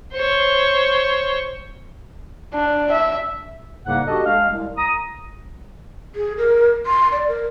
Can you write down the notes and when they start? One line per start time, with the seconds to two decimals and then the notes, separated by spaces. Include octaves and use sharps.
0.14 C5 C#5
2.54 D4
2.91 E5
3.86 C2 G#2 C#3 A#3 F#5
4.07 D4 F#4 G4 A4 D#5
4.26 G#3 F5
4.51 C2
4.77 A#5 D#6
6.15 G#4
6.37 A#4
6.86 C6
7.12 D5
7.28 A#4